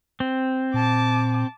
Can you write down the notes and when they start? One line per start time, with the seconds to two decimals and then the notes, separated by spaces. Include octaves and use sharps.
0.20 C4
0.74 A#2 A5 D6